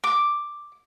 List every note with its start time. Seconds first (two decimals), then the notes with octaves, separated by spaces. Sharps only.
0.04 D6